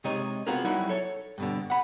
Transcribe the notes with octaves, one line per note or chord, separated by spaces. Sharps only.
C3 G#3 D#4 C#5 D#5
B3 C4 F4 F#4 G#4 A#4
F#3 G3 D#4 E4 F#4
A4 C#5
G2 B2 D3
F#5 B5